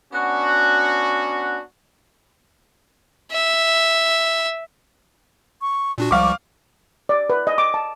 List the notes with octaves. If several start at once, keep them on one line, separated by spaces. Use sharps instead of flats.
B3 C#4 D4 F#4
E5
C#6
A#2 D4 F#4
C#2 F3 G3 F5 C#6 D6
D5
B4
D#5
D6
A5